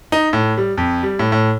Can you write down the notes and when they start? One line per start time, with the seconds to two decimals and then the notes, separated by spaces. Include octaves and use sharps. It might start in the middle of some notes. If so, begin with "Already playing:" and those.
0.12 D#4
0.33 A2
0.57 G3
0.77 F2
1.03 G3
1.19 A2
1.32 A2